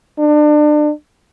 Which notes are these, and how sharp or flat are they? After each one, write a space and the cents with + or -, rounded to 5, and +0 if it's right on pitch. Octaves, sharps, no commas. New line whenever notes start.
D4 +30